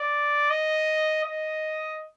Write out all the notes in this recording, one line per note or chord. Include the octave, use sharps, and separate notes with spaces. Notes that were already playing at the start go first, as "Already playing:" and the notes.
Already playing: D5
D#5
D#5